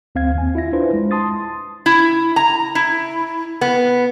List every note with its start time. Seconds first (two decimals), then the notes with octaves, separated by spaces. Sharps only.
0.15 D2 C4 F5 G#6
0.35 D#2 G#5
0.55 E4 F4 E5 A#6
0.73 D4 E4 F4 B4 C5
0.93 G#3
1.11 A5 C6 D#6 A6
1.86 E4
2.36 A#5
2.75 E4
3.61 B3